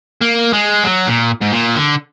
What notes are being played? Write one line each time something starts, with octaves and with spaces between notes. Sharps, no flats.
A#3
G#3
F#3
A#2
G#2
A#2
D3